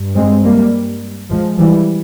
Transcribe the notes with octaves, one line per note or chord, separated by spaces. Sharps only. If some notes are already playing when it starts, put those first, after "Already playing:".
Already playing: G2
G#3 C4
G3 A#3
F3 G#3
E3 G3